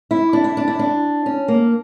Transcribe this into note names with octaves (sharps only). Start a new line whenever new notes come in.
E4
D4
E4
D4
E4
D4
C#4
A#3